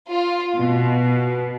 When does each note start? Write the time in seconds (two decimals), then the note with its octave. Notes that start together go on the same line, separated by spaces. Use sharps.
0.11 F4
0.57 B2